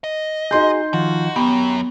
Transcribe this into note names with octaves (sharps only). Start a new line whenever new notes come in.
D#5
D#4 F#4 G#4 C6 G6
D#3 F3 F4 F#4
F#2 B3 G4